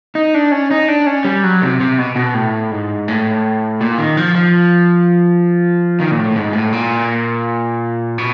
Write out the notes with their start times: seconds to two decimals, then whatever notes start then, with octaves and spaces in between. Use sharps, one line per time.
0.15 D#4
0.34 D4
0.52 C#4
0.71 D#4
0.88 D4
1.07 C#4
1.24 G3
1.44 F#3
1.62 C3
1.80 C3
1.99 B2
2.16 B2
2.34 A2
2.71 G#2
3.08 A2
3.81 A#2
3.98 D#3
4.17 F3
4.35 F3
6.00 D#3
6.11 A#2
6.18 A2
6.36 G#2
6.53 A2
6.73 A#2
8.18 B2